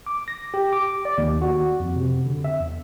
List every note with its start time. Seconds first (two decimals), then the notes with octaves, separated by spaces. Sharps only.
0.06 D6
0.28 A#6
0.54 G4
0.73 D6
1.05 D5
1.18 D#2
1.41 F#4
1.80 F2
1.96 C3
2.26 D3
2.44 E5
2.60 E2